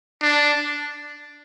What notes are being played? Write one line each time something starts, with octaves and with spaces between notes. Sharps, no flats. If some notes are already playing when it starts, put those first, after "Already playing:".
D4